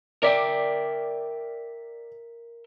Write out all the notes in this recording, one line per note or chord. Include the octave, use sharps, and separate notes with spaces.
A#4 D5 E5 G5